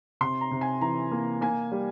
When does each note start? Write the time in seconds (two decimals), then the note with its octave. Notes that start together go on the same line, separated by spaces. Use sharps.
0.21 C3 C6
0.41 A#5
0.51 C3
0.61 G#5
0.81 E3 A#5
1.12 A#3
1.41 A#3 G#5
1.72 G3